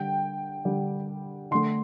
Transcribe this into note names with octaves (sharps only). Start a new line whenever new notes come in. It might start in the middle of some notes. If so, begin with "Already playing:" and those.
Already playing: D3 G3 G5
D3 G3
D3 A3 C6